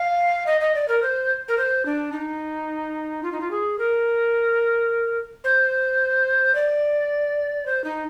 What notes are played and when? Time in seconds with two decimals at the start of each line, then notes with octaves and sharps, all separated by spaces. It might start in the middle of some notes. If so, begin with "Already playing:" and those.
Already playing: F5
0.46 D#5
0.61 D#5
0.75 D5
0.88 A#4
1.02 C5
1.48 A#4
1.58 C5
1.85 D4
2.12 D#4
3.23 F4
3.32 D#4
3.40 F4
3.51 G#4
3.78 A#4
5.44 C5
6.55 D5
7.66 C5
7.84 D#4